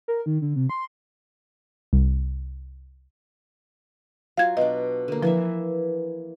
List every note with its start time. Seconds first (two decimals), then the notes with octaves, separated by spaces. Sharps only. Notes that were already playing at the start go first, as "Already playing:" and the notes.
0.08 A#4
0.26 D#3
0.42 D3
0.56 C3
0.70 C6
1.93 C2
4.37 F#3 F4 F5 G#6
4.57 B2 D4 D#5
5.08 D3 A#3
5.22 E3 F3 A#3 E5